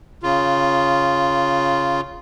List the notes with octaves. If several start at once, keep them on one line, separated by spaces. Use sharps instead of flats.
C#3 F4